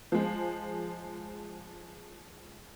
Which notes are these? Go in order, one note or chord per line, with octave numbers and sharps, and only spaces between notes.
F3 G#3